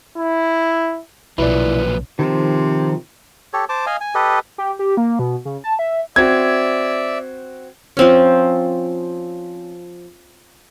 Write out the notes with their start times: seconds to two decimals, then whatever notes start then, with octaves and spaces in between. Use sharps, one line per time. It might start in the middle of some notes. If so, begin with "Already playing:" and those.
0.17 E4
1.38 B1 A#2 C#3 F3 F#3 E4 B4 D5
2.19 C3 D#3 F3
3.53 G4 A4 C#5
3.69 C5 A5 D6
3.86 D#5 F5 G#5
4.01 G#5
4.15 G4 A4 B4 D#5
4.58 G4
4.79 G4
4.97 A#3
5.19 B2
5.45 C#3
5.64 A5
5.79 E5
6.16 C4 F#4 D5 E5 G5 G#6
7.97 F3 C4 C#4